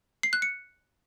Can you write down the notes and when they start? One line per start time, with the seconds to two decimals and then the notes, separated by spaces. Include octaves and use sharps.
0.23 C7
0.33 F#6
0.42 C#7